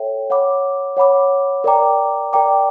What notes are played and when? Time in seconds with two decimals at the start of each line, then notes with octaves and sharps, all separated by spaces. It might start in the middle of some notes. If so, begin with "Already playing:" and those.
Already playing: A4 C#5 E5 G5
0.30 C#5 F#5 B5 D6
0.97 C#5 F#5 B5 D6
1.64 A#4 D5 G5 A#5 D6
2.33 A#4 D5 G5 A#5 D6